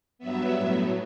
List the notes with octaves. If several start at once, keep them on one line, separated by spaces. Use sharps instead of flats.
G2 F#3 B3 E5
A2 F#3 B3